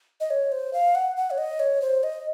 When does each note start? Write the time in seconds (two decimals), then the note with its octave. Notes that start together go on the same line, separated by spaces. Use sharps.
0.20 D#5
0.30 C#5
0.52 C5
0.73 F5
0.95 F#5
1.17 F#5
1.31 C#5
1.38 D#5
1.60 C#5
1.82 C5
2.03 D#5